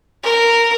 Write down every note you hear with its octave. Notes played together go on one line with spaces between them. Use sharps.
A#4